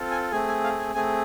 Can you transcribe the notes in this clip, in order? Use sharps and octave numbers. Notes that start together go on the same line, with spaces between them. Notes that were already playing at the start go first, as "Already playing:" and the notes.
Already playing: C4 F4 A4
G#5
A3 C4 G#4 G#5
G#5
F5
G#5
A3 C4 G#4 G#5